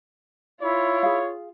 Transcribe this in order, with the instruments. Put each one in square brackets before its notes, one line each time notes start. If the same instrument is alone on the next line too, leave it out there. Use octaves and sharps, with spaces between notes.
[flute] E4 [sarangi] F4 [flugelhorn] C#5
[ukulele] G#4 F5